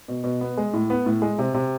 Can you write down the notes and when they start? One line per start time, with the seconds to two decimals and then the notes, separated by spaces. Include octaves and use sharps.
0.08 B2
0.24 B2
0.41 B3
0.57 G#3
0.73 A2
0.90 B3
1.06 A2
1.22 G#3
1.39 C3
1.54 C3